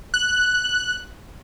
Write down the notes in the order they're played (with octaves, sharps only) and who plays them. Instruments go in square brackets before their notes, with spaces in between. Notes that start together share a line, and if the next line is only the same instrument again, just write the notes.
[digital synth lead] F#6